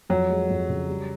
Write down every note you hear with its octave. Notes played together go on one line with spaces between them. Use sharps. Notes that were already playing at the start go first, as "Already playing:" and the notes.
F2 F#3
G#3
F2
C#3
G3